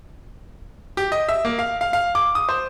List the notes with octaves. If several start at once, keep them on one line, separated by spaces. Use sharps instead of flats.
G4
D#5
E5
A#3
F5
F5
F5
D6
D#6
C5